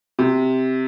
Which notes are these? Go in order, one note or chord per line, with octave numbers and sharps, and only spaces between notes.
C3